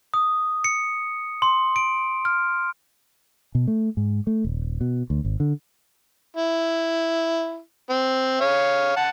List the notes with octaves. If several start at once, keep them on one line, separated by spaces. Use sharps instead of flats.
D#6
C#7
C6
D7
F6
B2
A3
G#2
A3
D#1
B2
D2
G#1
D3
E4
C4
C#5 F5
F#5 A5